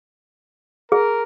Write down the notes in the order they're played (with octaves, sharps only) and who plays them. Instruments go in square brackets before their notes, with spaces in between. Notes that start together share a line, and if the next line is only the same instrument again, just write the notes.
[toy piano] G#4 [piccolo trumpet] A#4